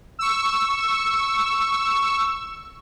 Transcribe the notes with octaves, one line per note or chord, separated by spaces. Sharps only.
C#6 E6